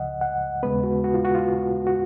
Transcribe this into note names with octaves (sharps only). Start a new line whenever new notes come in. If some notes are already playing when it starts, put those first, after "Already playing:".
Already playing: C#2 C#3 F3 D#5 F#5
F#5
D#2 C#3 G#3 B3 B4
F#4
F#4
F4
F#4
F4
F#4